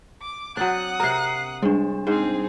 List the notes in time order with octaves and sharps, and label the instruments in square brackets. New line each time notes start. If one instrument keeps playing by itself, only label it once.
[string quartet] D6
[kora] F#3 C4 D4 [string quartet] F#5 D#6 F#6
[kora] C3 A#4 [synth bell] A#5 C7
[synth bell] G3 D4 [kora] G#3
[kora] G#2 C5 [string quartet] C4 G#4